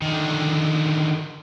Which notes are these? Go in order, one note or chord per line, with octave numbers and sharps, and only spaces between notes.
D3 D#3